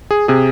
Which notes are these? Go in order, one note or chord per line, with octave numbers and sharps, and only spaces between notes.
G#4
C3 G#4